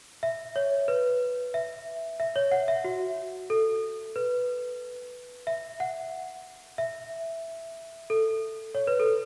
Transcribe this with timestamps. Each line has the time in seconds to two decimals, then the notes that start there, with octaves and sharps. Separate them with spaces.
0.23 E5
0.56 C#5
0.88 B4
1.54 E5
2.20 E5
2.36 C#5
2.51 F#5
2.68 E5
2.84 F#4
3.50 A4
4.16 B4
5.47 E5
5.80 F#5
6.78 E5
8.10 A4
8.75 C#5
8.87 B4
9.00 A4